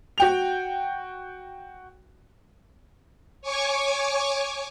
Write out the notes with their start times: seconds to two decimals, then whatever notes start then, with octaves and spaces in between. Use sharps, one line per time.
0.18 F#4 G5 F7
3.42 C#5 G#5 C#6 D6